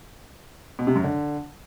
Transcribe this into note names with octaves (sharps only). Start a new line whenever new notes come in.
B2
C3
F#2
D3